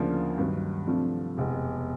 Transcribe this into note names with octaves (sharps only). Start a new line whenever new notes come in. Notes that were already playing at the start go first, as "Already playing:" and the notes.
Already playing: D2 C#3 F3 A#3 D4
G2 D#3 F#3
C2 C3 F3 A3 D4
F1 E2 B2 G#3